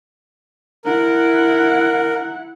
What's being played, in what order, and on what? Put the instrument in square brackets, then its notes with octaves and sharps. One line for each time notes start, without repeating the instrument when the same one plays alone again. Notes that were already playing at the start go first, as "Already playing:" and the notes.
[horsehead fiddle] E4 F#5 [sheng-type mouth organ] A#4